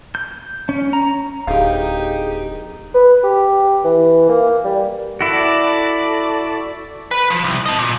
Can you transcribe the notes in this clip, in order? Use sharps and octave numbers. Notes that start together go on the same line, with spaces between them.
G6
C#4
A#5
D1 D#4 G4 G#4 F5
B4
G4
E3
A#3
G3
E4 F#4 A4 D5
B4
F3
C2
D#5 A5
A#2